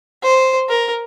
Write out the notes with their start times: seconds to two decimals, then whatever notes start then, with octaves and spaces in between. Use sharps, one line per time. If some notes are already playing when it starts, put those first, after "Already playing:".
0.23 C5
0.69 A#4